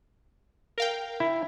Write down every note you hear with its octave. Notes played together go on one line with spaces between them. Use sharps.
A#4 F5 G5
E4